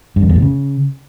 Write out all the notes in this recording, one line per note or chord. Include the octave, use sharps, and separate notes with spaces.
G2
F2
E2
A2
C#3